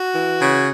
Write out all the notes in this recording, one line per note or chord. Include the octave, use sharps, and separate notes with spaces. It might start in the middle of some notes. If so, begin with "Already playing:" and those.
Already playing: F#4
E3
C#3